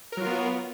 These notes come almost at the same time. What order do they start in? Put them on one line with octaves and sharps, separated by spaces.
A#4 F#3 F4 B3